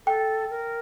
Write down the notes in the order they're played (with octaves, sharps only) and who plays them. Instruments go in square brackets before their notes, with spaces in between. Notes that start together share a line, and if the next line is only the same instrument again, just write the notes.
[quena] A4 [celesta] G5
[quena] A#4